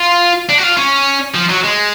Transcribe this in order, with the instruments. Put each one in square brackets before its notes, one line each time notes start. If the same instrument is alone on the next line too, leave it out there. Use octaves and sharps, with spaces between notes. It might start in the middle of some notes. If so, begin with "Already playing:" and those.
Already playing: [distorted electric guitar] F4
D4
F#4
F4
C#4
F3
F#3
G#3